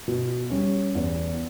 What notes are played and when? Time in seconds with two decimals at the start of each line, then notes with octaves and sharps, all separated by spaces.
0.08 B2
0.50 G3 C#4
0.95 E2